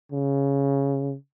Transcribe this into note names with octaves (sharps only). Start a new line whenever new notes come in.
C#3